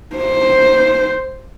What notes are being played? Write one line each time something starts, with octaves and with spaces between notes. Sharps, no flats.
C5